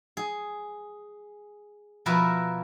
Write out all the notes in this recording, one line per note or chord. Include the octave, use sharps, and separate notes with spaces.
G#4
B2 F3 E4 A#4 B4 E5